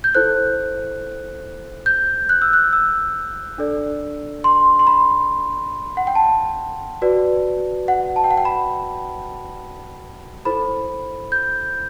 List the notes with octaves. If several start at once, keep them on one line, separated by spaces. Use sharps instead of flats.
G6
E4 A4 C5 F#6
G6
F#6
E6
F#6
E6
D4 A4 D5
C6
C6
B5
F#5
G5
A5
F#4 B4 D5
F#5
A5
G5
F#5
G5
B5
E4 A4 C5 B5
G6